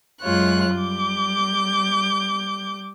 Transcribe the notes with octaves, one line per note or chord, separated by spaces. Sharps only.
F#2 G#3 F4 C#5 F#6
G3 D6 G6